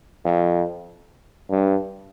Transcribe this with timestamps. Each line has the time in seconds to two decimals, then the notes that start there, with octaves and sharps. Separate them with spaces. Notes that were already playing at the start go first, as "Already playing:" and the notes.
0.25 F2
1.50 G2